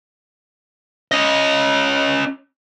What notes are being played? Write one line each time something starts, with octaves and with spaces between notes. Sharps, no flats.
C#4 D#5